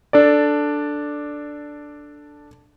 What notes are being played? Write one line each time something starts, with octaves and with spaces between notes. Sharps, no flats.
D4 A4 D5